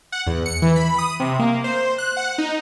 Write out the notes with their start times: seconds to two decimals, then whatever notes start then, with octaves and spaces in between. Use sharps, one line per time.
0.12 F#5
0.27 E2
0.46 C#7
0.62 E3
0.76 B5
0.98 D#6
1.20 C3
1.39 A#3
1.64 C5
1.98 F#6
2.17 F#5
2.38 D#4